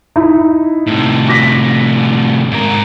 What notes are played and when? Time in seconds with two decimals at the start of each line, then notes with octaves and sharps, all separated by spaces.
0.16 D#4 E4
0.87 A2 C3
1.28 D6 A#6 B6
2.51 G#2 A#4